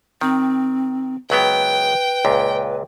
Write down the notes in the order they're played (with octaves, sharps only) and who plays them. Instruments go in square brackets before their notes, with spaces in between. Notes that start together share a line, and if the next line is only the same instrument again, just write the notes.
[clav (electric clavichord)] D#3 [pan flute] C4
[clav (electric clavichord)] C#2 F#3 B3 [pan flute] B4 [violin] G5
[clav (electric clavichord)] C#2 A#2